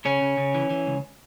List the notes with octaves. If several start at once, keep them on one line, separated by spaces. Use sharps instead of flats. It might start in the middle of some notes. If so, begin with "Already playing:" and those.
C#3 C#4
C#3
C#3
E3
E3
C#2